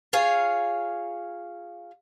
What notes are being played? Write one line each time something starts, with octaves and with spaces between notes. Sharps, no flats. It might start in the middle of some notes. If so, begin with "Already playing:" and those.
F4 G#4 C#5 F5